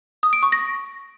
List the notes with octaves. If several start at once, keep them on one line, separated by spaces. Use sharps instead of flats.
D#6
D7
C#6
A#6